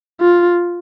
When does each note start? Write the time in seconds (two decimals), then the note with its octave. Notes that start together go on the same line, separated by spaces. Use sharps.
0.20 F4